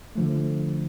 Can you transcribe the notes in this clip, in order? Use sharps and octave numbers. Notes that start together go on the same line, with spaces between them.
D3 F3 A3